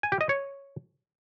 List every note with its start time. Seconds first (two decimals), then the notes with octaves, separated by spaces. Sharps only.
0.03 G#5
0.12 G4
0.21 D#5
0.29 C#5